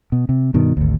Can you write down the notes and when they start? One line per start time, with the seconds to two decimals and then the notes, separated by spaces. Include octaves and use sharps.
0.12 B2
0.29 C3
0.54 G2 B2 D#3
0.77 G#1 D2